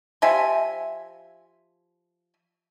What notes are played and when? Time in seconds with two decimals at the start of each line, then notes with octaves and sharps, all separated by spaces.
0.22 F3 G4 E5 G#5